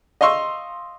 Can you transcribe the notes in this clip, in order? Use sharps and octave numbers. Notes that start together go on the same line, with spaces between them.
D#5 F5 C6 C#6 E6